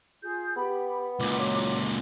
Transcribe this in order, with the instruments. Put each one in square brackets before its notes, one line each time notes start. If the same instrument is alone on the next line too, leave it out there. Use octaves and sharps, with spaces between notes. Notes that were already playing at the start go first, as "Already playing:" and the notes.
[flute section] F4 G#4 G6
[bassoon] B3 [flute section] G4 B5
[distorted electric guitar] C#2 A#2 [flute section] D6
[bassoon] F#3